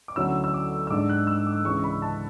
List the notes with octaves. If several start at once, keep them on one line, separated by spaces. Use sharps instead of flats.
D6
D2 D3 F#3 C#4 E4 E6
E6
D6
E6
G#2 G#3 D4 D6
F#6
E6
D6
C#2 C#3 E3 G#3 C#6
B5
A5